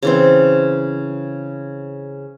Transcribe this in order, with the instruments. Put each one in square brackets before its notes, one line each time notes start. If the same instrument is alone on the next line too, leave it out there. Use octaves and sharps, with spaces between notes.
[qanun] C#3 E3 C4